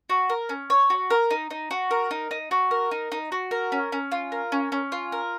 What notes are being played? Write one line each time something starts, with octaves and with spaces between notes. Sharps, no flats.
F#4
A#4
C#4
C#5
F#4
A#4
D#4
D#4
F#4
A#4
D#4
D#4
F#4
A#4
D#4
D#4
F#4
A#4
C#4
C#4
F4
A#4
C#4
C#4
F4
A#4